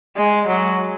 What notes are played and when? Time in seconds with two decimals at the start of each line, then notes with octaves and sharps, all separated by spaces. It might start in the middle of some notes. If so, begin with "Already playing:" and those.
0.17 G#3
0.47 F#3